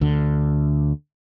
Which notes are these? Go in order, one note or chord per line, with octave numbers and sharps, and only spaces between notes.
D2 D3